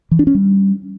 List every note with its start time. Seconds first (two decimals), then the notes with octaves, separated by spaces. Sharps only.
0.11 E3
0.19 D4
0.27 C#4
0.35 G3